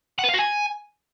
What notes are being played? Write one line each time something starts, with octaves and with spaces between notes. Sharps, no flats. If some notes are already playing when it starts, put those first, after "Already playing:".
F#5
B4
F5
F#4
G#5